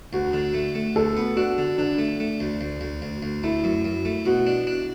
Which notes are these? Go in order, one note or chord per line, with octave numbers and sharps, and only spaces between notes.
D2 F#4
D3
A3
A3
D2 A4
B3
D4 F#4
D3
D3 D4
A3
A3
D2
D2
D2
D2
D2
A3 E4
F#2
F#2
A3
B2 F#4
D4
D4